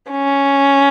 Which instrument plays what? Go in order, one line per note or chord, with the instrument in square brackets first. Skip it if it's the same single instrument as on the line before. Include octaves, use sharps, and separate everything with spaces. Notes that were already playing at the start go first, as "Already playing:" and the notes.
[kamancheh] C#4